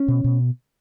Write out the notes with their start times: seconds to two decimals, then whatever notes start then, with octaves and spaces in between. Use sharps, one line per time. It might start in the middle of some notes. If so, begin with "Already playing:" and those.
Already playing: C#4
0.08 B2
0.24 B2